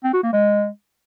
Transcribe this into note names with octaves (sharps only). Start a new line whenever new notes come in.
C4
F#4
A#3
G#3